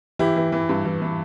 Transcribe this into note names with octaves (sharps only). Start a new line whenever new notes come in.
E3 E4 G4
E3
E3
G2
E3
E3